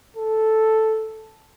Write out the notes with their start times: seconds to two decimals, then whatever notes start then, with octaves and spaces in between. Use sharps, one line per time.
0.16 A4